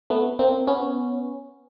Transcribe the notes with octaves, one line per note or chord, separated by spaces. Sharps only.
A3 B3
A#3 C4
B3 C#4